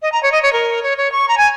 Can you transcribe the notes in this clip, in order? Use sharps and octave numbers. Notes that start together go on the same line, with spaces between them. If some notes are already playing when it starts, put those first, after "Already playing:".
D#5
A#5
C#5
D#5
C#5
A#4
C#5
C#5
C#6
A#5
G#5